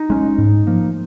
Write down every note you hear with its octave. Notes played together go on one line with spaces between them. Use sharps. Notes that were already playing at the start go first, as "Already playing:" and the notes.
Already playing: D#4
G#3 C#4
G#2
F3 A#3